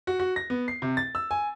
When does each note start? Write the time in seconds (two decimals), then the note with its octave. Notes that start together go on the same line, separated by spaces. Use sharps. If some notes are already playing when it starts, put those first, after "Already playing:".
0.07 F#4
0.19 F#4
0.36 A#6
0.50 B3
0.68 C7
0.82 C3
0.97 A6
1.15 E6
1.31 G#5